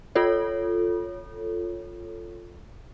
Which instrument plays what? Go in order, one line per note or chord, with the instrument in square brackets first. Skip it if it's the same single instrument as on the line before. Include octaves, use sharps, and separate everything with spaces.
[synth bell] F4 A4 C#5